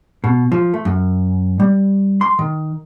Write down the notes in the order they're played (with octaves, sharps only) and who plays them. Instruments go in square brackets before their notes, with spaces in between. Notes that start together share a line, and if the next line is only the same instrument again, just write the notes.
[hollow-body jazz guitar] B2
F3
A3
F#2
G3
C6
D#3